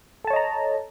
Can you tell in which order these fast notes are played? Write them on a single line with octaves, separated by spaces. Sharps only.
A4 A5 C#5 D#5 A#5